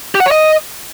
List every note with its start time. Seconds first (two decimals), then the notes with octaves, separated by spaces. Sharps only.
0.15 G4
0.20 F#5
0.26 C#5
0.31 D#5